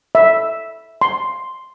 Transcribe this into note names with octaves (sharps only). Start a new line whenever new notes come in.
E5
C6